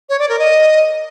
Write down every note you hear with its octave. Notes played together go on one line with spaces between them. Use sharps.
C#5
D5
A#4
D#5